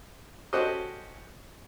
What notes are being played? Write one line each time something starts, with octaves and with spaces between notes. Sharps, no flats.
C#4 F#4 G4 A4 C5 D#5